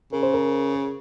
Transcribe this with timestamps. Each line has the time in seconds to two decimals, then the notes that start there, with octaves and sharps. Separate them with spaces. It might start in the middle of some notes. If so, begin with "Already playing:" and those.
0.13 C#3 A#4
0.23 C5
0.34 A#4